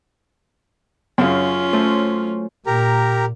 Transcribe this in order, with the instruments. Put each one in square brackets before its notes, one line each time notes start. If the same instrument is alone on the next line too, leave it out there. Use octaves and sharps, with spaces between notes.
[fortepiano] F#2 C#3 [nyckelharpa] C#4 F4
[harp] F#3 A3 C5
[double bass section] A#2 [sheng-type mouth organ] G4 A#4 A#5